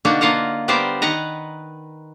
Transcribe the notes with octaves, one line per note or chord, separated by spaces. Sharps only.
B2 D3 A#3 D4 D#4 F#4
D3 A#3 F4 D#5 F5 F#5
G3 B3 G4 A#4 C5 D5
D#3 B4 D#5 F#5 A#5